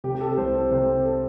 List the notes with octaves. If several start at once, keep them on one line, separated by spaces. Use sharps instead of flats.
C3 G4
G4
A4
A4
C2 C5
A4
C3 C5
A4